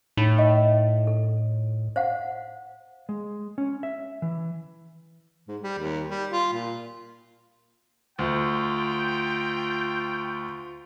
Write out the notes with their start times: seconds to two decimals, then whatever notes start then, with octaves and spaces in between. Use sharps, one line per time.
0.17 A2 D#4 B5
0.39 D#5
1.07 A4
1.96 C5 F5 F#5
3.09 G#3
3.58 C#4
3.83 E5
4.22 E3
5.48 G#2
5.61 G3
5.79 D#2
6.09 G3
6.31 F4
6.53 A#2
8.19 D2 F4 G5